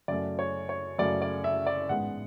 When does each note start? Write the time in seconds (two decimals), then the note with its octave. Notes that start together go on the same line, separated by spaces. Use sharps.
0.08 F#2 C#3 F#3 A3 D5
0.39 C#5
0.69 C#5
0.98 F#2 C#3 F#3 A3 D5
1.22 D5
1.44 E5
1.66 D5
1.89 A1 G#2 G#3 B3 F#5